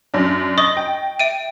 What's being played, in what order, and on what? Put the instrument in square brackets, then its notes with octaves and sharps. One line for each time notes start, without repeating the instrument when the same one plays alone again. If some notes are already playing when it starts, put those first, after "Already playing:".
[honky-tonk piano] F#2 D4
[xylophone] D#5 C#6 D#6 [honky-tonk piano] A#6
[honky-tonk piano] G5
[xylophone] E5 D7 D#7